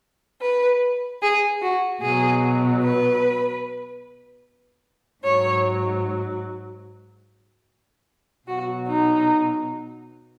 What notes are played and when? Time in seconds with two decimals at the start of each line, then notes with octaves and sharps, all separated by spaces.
0.42 B4
1.22 G#4
1.62 F#4
2.02 B2 F#3 G#4
2.83 B4
5.25 G#2 F#3 C#5
8.48 B2 F#3 F#4
8.89 D#4